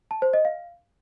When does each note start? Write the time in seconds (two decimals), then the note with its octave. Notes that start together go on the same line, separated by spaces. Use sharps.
0.11 A5
0.22 C5
0.33 D#5
0.45 F5